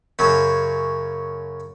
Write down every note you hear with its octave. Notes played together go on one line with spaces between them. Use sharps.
F#2 C#3 F#3